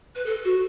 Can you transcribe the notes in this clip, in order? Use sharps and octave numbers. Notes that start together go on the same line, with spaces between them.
B4
A4
F#4